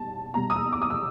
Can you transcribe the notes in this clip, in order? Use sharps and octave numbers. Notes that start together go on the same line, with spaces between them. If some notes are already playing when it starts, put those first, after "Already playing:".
Already playing: B2 G3 A5
B2 G3 A#5
D#6
E6
D6
D#6
E6